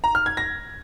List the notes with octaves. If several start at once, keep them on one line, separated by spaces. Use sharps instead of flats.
A#5
F6
G#6
A#6